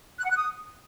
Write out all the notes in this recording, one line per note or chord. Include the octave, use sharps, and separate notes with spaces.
F#6
F#5
F#6
D#6